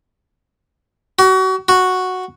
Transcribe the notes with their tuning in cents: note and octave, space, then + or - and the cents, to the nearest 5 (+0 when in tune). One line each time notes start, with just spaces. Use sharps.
F#4 +30
F#4 -5